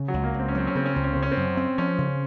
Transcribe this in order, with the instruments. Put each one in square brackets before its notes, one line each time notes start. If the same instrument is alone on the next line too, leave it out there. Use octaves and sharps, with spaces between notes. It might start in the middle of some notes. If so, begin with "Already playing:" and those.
Already playing: [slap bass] C#3
[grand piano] F#3
[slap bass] C#2
[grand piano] A#3
[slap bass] C#2
[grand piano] C4
C#4
[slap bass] F#3 [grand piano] C4
[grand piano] C#4
[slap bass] C#3 [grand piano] C4
[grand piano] C#4
[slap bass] C#2 [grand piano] C4
[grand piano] C#4
[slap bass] C#3 [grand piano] C4
[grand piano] C#4
C4
[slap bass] F#2
C4
[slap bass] F3 [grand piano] C#4
[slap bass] C#3